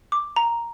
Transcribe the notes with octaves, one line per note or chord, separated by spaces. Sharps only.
D6
A#5